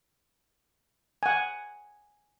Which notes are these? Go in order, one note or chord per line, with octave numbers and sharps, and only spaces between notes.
F#5 G#5